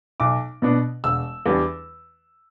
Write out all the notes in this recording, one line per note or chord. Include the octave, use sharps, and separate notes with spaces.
B1 D6
B2 B3 D4
E1 E6
E2 E3 G3 D4